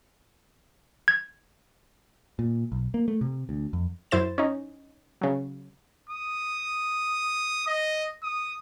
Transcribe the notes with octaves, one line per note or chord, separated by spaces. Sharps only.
G#6
A#2
B1
A#3
A3
C3
D2
F2
F#2 E4 C5 A6 E7
C#4 D#4
C#3 F#3
D#6
D#5
D#6